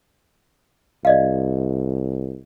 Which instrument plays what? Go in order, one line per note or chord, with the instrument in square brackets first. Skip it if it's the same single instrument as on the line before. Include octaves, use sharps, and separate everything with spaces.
[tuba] C2 [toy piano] D5 D#5 F5